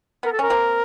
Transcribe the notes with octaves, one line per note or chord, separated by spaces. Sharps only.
B3 A#4
A4
C#4 A#4
A#3 C4